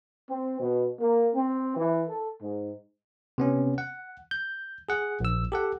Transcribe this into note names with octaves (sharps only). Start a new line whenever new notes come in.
C4
B2
A#3
C4
E3
A4
G#2
C3 B3 C#4
F#5
G6
G#4 F#5
A#1 E6
G4 A4 F#5